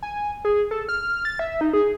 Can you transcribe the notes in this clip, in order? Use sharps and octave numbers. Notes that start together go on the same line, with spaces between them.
G#5
G#4
A4
F6
A6
E5
D#4
G#4